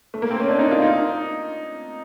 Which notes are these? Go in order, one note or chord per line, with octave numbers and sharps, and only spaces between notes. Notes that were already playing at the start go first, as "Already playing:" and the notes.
A3
A#3
C4
C#4
D4
D#4
F4
D#4